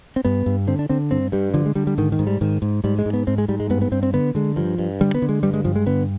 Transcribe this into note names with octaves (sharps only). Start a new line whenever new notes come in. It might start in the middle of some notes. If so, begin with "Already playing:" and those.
C4
G2 B3
G2
D3 C4
D4
D3 C4
G2 C4
G2 G3
D3 F3
G#3
D3 G3
G3
G#2 D#3
D#3
G#2
G3
G#2 D#3
G#2
G#2 G3
G#3
G#2
B3
G#2 C4
G#3
G#2 G3
G#3
G2 B3
B3
G2 C4
C4
D3 B3
D3 G#3
G2 F3
G2
D3 G3
B3
D3
G#3
G2 G3
G#3
G2 F3
G#3
D3 B3